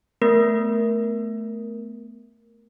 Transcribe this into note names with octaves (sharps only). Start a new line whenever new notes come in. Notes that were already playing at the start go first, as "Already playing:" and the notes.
A3 B3 A#4 A#6